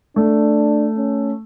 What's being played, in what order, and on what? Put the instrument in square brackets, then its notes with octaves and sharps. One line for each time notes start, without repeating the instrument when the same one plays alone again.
[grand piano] A3 [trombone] D4
[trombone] C#4